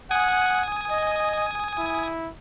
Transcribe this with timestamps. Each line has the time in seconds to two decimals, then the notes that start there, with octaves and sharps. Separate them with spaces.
0.11 F#5 G#5 D#6
0.91 D#5
1.78 E4